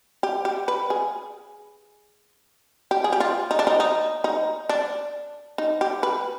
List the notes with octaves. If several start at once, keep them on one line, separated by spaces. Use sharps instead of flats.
G4
G4
B4
G#4
G4
G#4
G4
F4
D#4
D4
D#4
D#4
D#4
D4
D#4
G4
B4